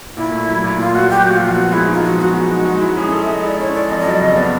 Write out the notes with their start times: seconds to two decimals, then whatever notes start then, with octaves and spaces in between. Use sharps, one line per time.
0.17 A#2 E4
0.32 A3
0.48 F#3
0.64 A#2
0.78 A#2 F4
0.94 A3 F#4
1.10 F#3 G4
1.23 A#2 F#4
1.36 F3 F4
1.50 F#4
1.57 B3
1.72 G#3 E4
1.87 D#4
1.93 F4
2.03 F3 F#4
2.19 B3 F#4
2.34 G#3 F#4
2.50 D#4
2.65 G#3
2.81 E4
2.97 C#4 G#4
3.12 A4
3.21 E5
3.28 G#3
3.33 D#5
3.43 E4 D5
3.59 C#4 C#5
3.74 A4 D5
3.90 F2 D#5
4.01 D#5
4.06 F#3 D5
4.20 C#3 D#5
4.36 B3 D5